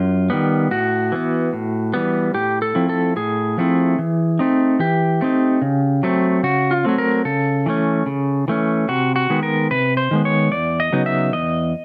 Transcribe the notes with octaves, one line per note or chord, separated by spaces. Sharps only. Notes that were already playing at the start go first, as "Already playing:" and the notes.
Already playing: F#2 F4
D#3 G3 B3
A2 F#4
E3 G3 B3
A2
E3 G3 B3
A2 G4
A4
F3 A3 C4 E4
A4
A2 G#4
F3 A3 C4 E4
E3
A3 C4 D#4
E3 G4
A3 C4 D#4
C#3
F#3 A3 C4
C#3 F#4
F4
F#3 A3 C4
A#4
C#3 A4
E3 A3 C#4
C#3
E3 A3 C#4
C3 F#4
F#4
D#3 G#3 B3
A#4
C3 B4
C5
D#3 G#3 B3
C#5
E2 D5
D#5
C#3 F#3 B3 D#4
E5
E2 D#5